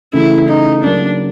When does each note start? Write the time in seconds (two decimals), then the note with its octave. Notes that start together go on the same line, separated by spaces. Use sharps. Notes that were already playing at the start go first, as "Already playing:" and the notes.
0.13 C#3 E3 A3 E4
0.48 D#4
0.83 C#3 F#3 A#3 D4